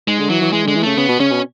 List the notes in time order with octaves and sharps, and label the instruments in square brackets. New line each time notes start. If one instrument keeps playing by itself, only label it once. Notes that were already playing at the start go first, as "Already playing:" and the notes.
[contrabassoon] G#2 [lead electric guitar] G#3
[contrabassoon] D3
[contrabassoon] E3 [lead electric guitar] F#3
[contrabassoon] E3
[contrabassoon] E3 [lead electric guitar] G#3
[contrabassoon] D3 [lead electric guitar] G#3
[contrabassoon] E3
[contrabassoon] C#3 [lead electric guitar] A3
[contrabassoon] C#3 [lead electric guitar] B3
[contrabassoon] B2
[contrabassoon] C#3 [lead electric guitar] C#4
[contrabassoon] B2